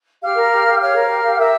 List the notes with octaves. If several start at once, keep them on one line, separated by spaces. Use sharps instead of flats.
G4 F5 F6
A#4
G4
G4
C#5 F5 F6
A#4
G4
G4
A#4 E5 E6